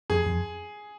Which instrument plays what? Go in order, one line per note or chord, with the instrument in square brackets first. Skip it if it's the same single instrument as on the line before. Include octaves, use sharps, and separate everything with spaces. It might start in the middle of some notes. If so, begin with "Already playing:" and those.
[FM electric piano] F2 [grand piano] G#4
[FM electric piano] F2